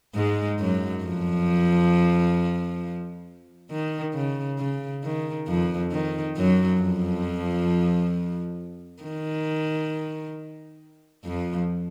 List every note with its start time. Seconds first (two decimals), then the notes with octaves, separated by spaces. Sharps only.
0.15 G#2 G#3
0.59 F#2 F#3
1.04 F2 F3
3.71 D#3
4.14 C#3
4.59 C#3
5.04 D#3
5.48 F2 F3
5.92 D#3
6.37 F#2 F#3
6.81 F2 F3
9.03 D#3
11.25 F2 F3